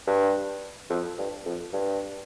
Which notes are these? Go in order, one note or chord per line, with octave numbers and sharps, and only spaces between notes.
G2
F2
G2
F2
G2